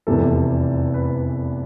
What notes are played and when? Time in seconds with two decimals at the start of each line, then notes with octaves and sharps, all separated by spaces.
0.07 F1 E2 C3 E3 A4
0.94 B4